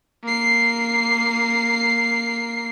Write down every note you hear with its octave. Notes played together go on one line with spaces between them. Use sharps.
A#3 C7